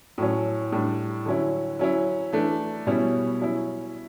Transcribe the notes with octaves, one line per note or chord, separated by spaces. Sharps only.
A2 F#3 C#4
A2 G3 D4
D3 F#3 C#4 E4
F#3 C#4 E4
E3 A3 D4
B2 G3 C#4 E4
F#3 C#4 E4